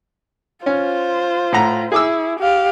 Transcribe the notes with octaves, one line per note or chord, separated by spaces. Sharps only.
C#4 F4 C5
A2 F#5 A#5
E4 G#4 D6 E6
G4 F5